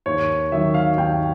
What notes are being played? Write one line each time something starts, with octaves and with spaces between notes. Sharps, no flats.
D#2 C#5
D#3 F#3 E5
F5
D#2 G5